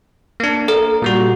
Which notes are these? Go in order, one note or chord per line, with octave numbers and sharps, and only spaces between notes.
A#3 D4
A4 A#4
A#2 G3 F#4